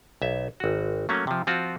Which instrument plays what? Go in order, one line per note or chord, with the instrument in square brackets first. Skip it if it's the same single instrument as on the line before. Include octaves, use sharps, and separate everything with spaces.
[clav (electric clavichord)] B1 E5
G#1 F#4
F#3 A3 A#3 C#4
C3 F3
F3 C4 F4 F#4